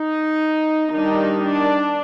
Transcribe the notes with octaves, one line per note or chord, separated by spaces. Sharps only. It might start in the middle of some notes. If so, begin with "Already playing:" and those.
Already playing: D#4
D#3 G3 D4 D#4
D4